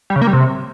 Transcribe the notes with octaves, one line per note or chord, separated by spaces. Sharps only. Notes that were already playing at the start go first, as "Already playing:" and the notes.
G3
C#3
A#3
G3
C3